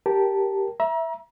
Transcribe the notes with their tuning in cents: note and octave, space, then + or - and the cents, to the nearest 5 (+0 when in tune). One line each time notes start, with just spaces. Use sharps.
G4 +0 A#4 +0 A5 +0
E5 +0 A#5 +35